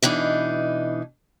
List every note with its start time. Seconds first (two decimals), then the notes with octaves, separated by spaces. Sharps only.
0.02 B2 E3 D4 D#4